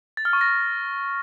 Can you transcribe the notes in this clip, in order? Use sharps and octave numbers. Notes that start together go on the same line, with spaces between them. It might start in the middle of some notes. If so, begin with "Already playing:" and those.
A6
F6
C#6
A#6
A6